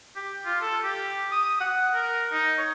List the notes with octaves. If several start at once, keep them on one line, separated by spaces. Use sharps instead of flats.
G4
F4
A4
G4
D#6
F#5
A#4
D#4
C#5